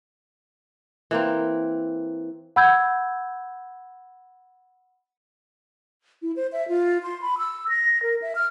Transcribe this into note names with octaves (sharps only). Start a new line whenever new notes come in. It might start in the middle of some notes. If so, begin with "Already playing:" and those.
E3 A#3 C4
F#5 B5 E6 G6 G#6
E4
C5
E5
F4
C6
B5
E6
A#6
A#4
E5
F6